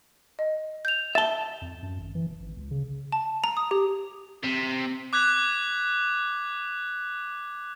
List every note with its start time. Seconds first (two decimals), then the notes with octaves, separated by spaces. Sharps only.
0.39 D#5
0.85 G6 F7
1.15 E5 A5 A6 G7
1.62 F2
1.82 F#2
1.99 G#1
2.15 E3
2.27 E1
2.40 G#1
2.56 C#2
2.71 C#3
3.12 A5
3.44 A#5
3.57 D#6
3.71 G4
4.43 C3
5.13 D6 F#6 G#6 B6 F7